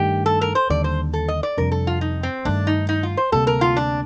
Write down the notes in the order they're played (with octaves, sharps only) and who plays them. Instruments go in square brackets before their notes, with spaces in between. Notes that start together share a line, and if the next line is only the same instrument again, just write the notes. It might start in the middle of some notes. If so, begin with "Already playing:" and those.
Already playing: [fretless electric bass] G2 D#3 A3 [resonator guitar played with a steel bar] G4
[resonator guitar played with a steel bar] A4
A#4
C5
[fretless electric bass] D#2 D3 G3 [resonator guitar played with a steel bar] D5
[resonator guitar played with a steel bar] C5
A4
D#5
D5
[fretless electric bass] F2 C3 G3 D4 [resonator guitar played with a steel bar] A#4
[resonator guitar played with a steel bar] A4
F4
D#4
C4
[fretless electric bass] G2 D#3 A3 [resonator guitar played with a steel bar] D4
[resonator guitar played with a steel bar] D#4
D#4
F4
C5
[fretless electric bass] D2 C3 G3 A#3 [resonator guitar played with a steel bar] A4
[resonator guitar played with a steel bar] A#4
F4
D4